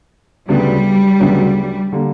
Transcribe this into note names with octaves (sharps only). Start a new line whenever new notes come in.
D2 C#3 F#3 G3 B3 D4
D2 C#3 F#3 B3 D4
D3 G3 A#3